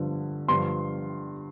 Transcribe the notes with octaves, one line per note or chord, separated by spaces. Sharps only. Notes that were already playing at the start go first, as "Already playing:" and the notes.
Already playing: G2 D3 F3
G2 D3 F3 C6